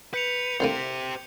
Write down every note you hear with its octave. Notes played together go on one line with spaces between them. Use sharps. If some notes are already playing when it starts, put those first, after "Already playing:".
B4 G6 C#7 F7
C2 D3 A#3 G4 C5